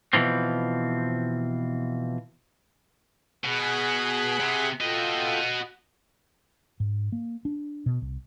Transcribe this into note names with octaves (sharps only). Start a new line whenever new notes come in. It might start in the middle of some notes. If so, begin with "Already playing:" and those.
B2 E3 F3 C4
B2 G#4 F#5 B5
C3
F4 F#4 A4 D#5 G5
G#2
A#3
D4
B2
C2